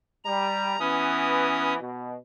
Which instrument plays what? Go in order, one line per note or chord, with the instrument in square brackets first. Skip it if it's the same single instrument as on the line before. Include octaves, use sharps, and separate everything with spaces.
[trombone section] G3 [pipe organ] A#5
[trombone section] E3 B3 B4 [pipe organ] C#4 D#6
[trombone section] B2